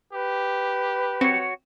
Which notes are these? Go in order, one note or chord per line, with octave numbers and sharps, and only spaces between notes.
G4 B4
C4 F#4 C#5